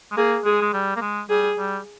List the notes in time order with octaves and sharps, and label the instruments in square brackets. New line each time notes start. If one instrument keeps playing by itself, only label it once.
[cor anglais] G#3
[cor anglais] A#3 [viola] G#4
[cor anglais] G#3 [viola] G#4
[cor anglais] G#3
G3
A#3
G#3
[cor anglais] G3 [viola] G#4
[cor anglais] G3